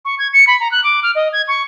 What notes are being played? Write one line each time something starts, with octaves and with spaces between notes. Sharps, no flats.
C#6
G#6
C#7
B5
A#5
F#6
D6
F6
D#5
G#6
C#6